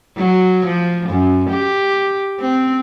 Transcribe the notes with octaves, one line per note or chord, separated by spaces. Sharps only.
F#3
F3
F#2
G4
C4